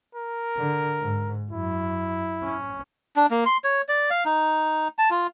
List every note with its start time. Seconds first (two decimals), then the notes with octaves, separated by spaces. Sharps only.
0.15 A#4
0.57 D3
0.99 G#2
1.52 F#2 E4
2.43 C#4
3.16 D4
3.31 A#3
3.46 C6
3.64 C#5
3.89 D5
4.11 F5
4.25 D#4
4.99 A5
5.11 F4